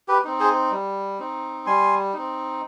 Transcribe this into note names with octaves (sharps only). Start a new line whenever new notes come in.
G4 B4
C4 D#4
G#4 C5
G3
C4 D#4
G3 G#5 C6
C4 D#4